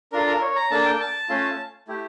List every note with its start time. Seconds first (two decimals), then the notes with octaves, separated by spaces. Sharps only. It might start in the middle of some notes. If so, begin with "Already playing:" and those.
0.12 D4 F4 A4 A#4
0.27 A#4
0.42 C#5
0.56 A#5
0.71 A#3 D4 A4 A5
0.85 G5
1.00 A5
1.29 A3 C#4 F4 A4
1.88 A3 E4 G4